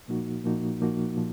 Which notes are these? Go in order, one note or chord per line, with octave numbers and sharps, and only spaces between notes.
A#2 F3 A#3 D#4 F#4
A#2 F3 A#3 D#4 F#4
A#2 F3 A#3 D#4 F#4
A#2 F3